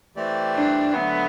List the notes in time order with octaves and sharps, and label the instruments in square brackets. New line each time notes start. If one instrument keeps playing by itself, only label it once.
[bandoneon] E3 A3 C4 G4 D5
[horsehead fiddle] D4
[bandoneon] D3 F#3 A3 [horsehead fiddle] B3